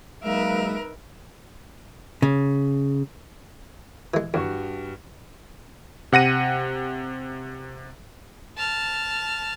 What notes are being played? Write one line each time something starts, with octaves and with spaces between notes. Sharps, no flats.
F#3 G#3 A#3 D#4 A#4 B4 E5 F5
C#3
E3 G#3
E2 G2 F#4 C#6
C3 F#5 A#6 D#7
A5 F6